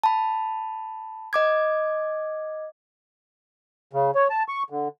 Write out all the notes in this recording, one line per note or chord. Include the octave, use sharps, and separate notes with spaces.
A5 B5
D#5 D6 G#6
C#3
C#5
A5
C#6
D3